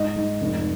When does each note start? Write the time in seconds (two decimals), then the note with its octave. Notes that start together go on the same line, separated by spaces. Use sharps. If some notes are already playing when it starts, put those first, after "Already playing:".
Already playing: G#2 D#5
0.16 G#2
0.41 F1